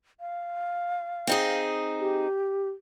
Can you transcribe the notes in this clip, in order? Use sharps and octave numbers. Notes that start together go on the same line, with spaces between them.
F5
C4 D#4 G#4
G4